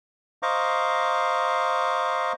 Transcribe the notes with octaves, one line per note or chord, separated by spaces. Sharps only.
C5 D#5 F5 A#5 C#6 D6